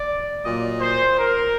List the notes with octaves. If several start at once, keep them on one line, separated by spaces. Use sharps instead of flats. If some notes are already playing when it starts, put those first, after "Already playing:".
Already playing: D5
A#2 F#3 D#5
C5
A#4